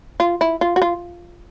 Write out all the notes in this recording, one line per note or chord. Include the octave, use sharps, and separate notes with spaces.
F4
E4
F4
F#4
F4